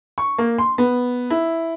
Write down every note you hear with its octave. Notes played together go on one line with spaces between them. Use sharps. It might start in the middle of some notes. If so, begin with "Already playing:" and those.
C#6
A#3
C6
B3
E4